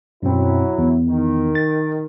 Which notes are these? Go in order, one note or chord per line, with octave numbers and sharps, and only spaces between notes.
F#2 B2 F#3 C4 E4
E2
D#3
A6